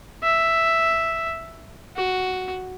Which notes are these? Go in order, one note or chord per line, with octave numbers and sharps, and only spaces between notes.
E5
F#4